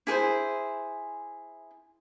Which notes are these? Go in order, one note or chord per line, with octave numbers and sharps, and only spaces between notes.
E4 G#4 B4 C5